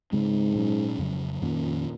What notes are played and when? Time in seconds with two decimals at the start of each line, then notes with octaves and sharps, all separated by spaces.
0.12 G#2 C#3 G#3 C4
0.55 A#2 F#3 C#4
0.98 F2 C#3 F#3
1.42 F2 A#2 D#3 A#3 C#4